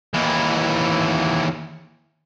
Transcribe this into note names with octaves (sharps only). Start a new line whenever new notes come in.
D#2 E3